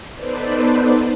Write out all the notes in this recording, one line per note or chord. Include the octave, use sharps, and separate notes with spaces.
B3 D#4 A4 B4 C5 D5